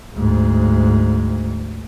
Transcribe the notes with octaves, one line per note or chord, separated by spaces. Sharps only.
D2 G#2